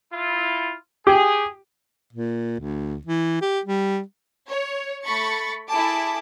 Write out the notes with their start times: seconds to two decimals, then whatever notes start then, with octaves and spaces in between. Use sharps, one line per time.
0.11 E4 F4
1.07 G4 G#4
2.13 A#2
2.60 D2
3.07 E3
3.41 G4
3.65 G3
4.48 C#5
5.05 A3 B5 C#6 A6 C#7
5.69 E4 G#4 A4 A5 D6